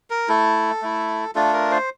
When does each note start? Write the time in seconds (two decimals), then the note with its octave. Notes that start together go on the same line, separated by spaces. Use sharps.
0.10 A#4
0.28 A3 E4 A4
0.82 A3 E4
1.35 A3 D4 F4 A4
1.53 A#4
1.71 C5